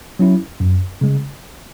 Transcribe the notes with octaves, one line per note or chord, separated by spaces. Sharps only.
F#3 C#4 E4
F#2
C#3 G#3